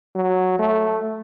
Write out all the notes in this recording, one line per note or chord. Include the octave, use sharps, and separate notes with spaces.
F#3
A3